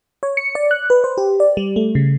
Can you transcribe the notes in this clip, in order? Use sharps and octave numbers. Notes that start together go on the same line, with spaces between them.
C#5
C#7
D5
F#6
B4
C5
G4
D5
G3
A3
C#3